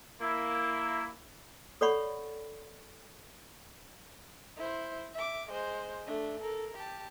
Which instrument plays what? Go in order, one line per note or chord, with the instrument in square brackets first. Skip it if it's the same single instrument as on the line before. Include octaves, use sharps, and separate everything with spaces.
[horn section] A#3 E4
[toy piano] A4 C#5 D5 F#5 B5 C#6
[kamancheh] E4 C5
E5 D6
G#3 C5
A3 D4
A4 A#4
G4 A5